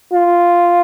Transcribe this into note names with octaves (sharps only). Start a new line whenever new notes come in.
F4